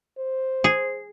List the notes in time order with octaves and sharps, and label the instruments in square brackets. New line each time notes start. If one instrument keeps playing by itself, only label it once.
[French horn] C5
[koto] G#4